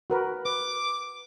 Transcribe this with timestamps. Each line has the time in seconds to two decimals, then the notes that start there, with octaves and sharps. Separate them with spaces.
0.10 F#4 A#4 B4
0.45 B4 D6